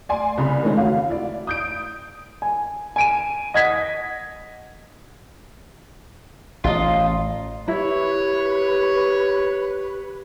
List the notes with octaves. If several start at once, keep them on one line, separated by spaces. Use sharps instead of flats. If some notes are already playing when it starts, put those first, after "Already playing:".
D5 G#5 C6
C2 C#3 B5
D#3 E3 G#3 A3 C#4
F#4 F5
E4 D5
D#6 G6 D7
G#5
G#5 D7 D#7
D#5 F#5 G#6 A#6 B6
A1 F4 D#5
E4 G4 B4 C#5